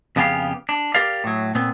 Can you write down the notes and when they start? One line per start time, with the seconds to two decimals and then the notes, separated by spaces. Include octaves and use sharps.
0.16 F2 C#3 B3 G4 G#4 F5
0.69 D4
0.94 G4 A#4 D5 F5
1.24 A2 F#3
1.55 A#2 B3 C4